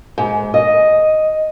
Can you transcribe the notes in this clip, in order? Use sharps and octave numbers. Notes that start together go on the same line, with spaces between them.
G#2
D#5